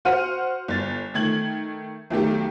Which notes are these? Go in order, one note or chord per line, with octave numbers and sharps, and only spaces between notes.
F#4 C5 F#5 F6 D#7
G1 A6
D#3 A3 G#6 F#7
B1 D#3 F#3 A3 G4